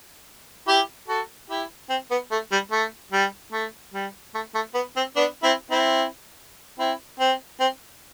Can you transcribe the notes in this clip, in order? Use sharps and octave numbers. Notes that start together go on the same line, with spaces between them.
E4 G4
F#4 A4
E4 G4
C4
B3
A3
G3
A3
G3
A3
G3
A3
A3
B3
C4
B3 D4
C4 E4
C4 E4
C4 E4
C4
C4